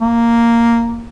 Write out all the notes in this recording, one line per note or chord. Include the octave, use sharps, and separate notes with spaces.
A#3